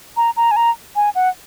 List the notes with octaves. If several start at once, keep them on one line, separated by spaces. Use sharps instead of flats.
A#5
A#5
G#5
A#5
G#5
F#5